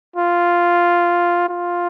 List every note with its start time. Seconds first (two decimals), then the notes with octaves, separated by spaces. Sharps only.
0.16 F4
1.49 F4